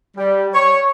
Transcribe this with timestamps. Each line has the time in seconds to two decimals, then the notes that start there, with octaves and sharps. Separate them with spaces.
0.17 G3
0.54 C#5